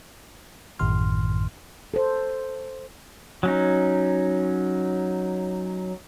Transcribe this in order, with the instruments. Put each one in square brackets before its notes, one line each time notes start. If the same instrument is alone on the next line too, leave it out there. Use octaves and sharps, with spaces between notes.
[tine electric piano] A1 F#2 A2 D#3 C6 F6
[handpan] A4 C5
[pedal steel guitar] F#3 C#4 D#4